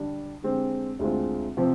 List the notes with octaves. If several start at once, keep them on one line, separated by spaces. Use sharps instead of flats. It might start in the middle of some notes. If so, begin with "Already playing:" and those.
Already playing: D3 G3 D4
D3 G#3 C4 G4
D2 D3 G#3 C4 F4
C3 F3 C4